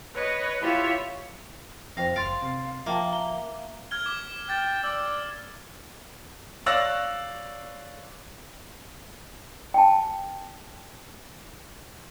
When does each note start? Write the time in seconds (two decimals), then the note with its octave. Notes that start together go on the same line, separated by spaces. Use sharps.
0.14 B4 C#5 D#5
0.60 E4 F4 G4 C#5 E5 F5
1.97 F2 C5 F5 G5 A#6
2.16 F#1 F5 C6 A6 D7
2.42 C3
2.86 F3 A#3 E5 G5 A5
3.13 E5 A#5 G7
3.91 F6 G#6 G7
4.06 D6
4.49 G5 F6 A6
4.83 D5 E6
6.66 C#5 D5 F5 E6 F#6 A#6
9.74 G5 A5